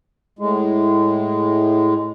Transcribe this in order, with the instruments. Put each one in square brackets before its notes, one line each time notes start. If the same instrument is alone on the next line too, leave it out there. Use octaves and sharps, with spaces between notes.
[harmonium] A2 G#3